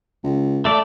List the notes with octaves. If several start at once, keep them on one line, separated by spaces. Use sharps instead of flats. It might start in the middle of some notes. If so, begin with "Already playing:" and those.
C#2
A3 D5